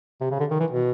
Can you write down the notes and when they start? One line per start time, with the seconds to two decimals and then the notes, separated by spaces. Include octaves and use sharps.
0.21 C3
0.31 C#3
0.40 D3
0.51 D#3
0.60 E3
0.71 B2